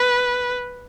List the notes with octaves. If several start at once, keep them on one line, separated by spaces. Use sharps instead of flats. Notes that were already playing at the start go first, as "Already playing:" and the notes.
Already playing: B4